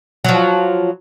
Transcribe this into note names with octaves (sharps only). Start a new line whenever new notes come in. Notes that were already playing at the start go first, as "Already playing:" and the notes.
F3 F#3